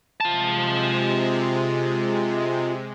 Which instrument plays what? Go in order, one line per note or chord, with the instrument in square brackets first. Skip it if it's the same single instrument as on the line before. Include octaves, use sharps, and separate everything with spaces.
[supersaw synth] C3 G#3 [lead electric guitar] F4 A5